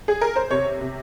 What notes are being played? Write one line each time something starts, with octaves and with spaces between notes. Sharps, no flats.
G#4
A#4
C5
C3 C#5
C3